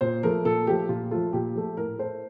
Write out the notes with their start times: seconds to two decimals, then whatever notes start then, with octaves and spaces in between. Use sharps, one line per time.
0.01 A#2 C5
0.23 F3 A3 A#4
0.45 A#2 A4
0.67 F3 A3 G4
0.89 A#2 F4
1.11 F3 A3 F4
1.33 A#2 G4
1.55 F3 A3
1.77 A2 A#4
1.99 A3 C5